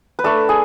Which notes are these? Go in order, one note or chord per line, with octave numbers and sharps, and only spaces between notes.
B4
A3 D4 A4
G#4